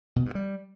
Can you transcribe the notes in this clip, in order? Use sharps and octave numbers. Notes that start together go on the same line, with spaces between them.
B2
G2
G3